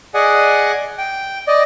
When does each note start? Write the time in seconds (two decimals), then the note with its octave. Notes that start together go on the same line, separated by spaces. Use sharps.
0.14 G#4 D5 D#5 F#5 G#5
0.98 G5
1.47 D5 D#5